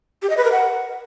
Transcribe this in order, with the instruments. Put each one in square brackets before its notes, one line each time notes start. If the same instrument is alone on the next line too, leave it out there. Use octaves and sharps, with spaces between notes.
[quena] G4
D#5
B4
A#4
F#5